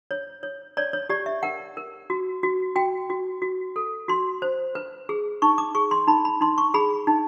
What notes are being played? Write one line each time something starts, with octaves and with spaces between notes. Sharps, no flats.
C#5
C#5
C#5 D5
C#5
G4 D5
E5
A#4 F#5
A#4
F#4
F#4
F#4 G5
F#4
F#4
A4
F#4 C6
C5
B4
G#4
D#4 C#6
D6
G#4 C#6
C6
D#4 B5
B5
D#4 C6
C#6
G#4 B5
D#4